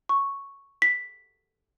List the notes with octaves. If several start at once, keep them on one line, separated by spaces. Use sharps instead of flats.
C#6
B6